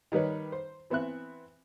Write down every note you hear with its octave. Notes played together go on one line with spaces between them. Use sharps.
D#3 G3 D#4 B4 C#5
C5
E3 B3 C4 E5 F#6